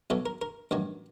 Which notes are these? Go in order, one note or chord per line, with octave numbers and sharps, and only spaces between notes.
B1 B2 F#3 A4
A#4
A#4
A1 G2 D#3 F#3